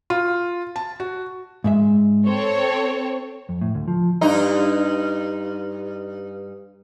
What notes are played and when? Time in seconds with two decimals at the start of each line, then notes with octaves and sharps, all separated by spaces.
0.10 F4
0.76 A5
1.00 F#4
1.64 G#2 G#3 E5
2.27 C4 A4 C5 C#5
3.49 F2
3.61 A2
3.75 D2
3.88 F3
4.21 G2 D#4